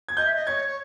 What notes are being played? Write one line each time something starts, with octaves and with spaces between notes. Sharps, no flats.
G#6
D#5 G6
E5
D#5
C#5 G#6
C#5